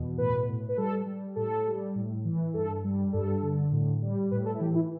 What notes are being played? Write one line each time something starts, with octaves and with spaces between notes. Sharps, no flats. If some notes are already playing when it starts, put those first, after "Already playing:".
Already playing: E2 B2
A2 B4
A2
B4
G3 A4
G3
A2 A4
G3
A2
E3
G2 A4
G3
G2 A4
D3
A2
G3
A2 B4
A4
E4
E3 G4
E4